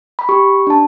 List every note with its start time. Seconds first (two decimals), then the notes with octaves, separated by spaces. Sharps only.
0.19 B5
0.29 G4 C#6
0.67 D4 A5